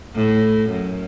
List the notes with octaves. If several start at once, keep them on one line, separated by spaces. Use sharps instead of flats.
A2
F#2